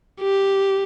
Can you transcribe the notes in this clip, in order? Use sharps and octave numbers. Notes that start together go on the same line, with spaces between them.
G4